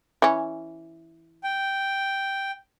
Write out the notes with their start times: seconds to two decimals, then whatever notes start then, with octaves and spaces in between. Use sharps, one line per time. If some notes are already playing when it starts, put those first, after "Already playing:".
0.22 E3 C#4
1.44 G5